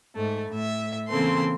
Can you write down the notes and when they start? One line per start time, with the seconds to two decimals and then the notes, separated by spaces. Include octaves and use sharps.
0.16 G#2 A3
0.51 A2 E5
1.08 C#3 E3 A#3 C4 A4 C6